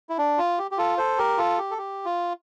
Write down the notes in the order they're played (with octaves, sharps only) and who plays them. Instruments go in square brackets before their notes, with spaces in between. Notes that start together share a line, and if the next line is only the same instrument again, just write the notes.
[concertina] E4
D4
F4
G4
G4
F4 A4
A4 C5
G4 A#4
F4 A4
G4
A4
G4
F4